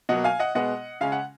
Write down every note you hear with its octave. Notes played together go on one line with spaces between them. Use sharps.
B2 F#3 A#3 D#5 F#5
F5 G#5
D#5 F#5
B2 G#3 B3 D#5 F#5
C#3 G#3 C#4 F5
F#5